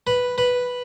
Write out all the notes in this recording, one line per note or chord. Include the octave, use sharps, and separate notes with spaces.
B4
B4